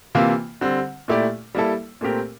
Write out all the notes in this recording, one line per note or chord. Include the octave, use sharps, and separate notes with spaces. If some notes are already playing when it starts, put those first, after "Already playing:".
C3 E3 A#3 F4
D3 G3 C4
A#2 A3 E4 G4 D5
G3 A#3 E4 A4
A#2 A3 C4 G4 A#4